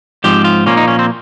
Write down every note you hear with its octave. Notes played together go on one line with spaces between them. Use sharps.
G#2 F3 C4 G4
F4
A#2 F3 A#3 C#4
D#4
C#4
C4